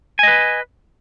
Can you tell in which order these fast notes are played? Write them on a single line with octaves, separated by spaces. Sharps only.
G#5 D#5 B4